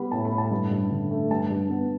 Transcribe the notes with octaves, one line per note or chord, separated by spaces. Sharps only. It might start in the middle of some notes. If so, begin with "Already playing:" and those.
Already playing: G3 B3 B5
A2 A5
B5
A2
A5
G2
G2
D3
A3
G2 A5
G2
B3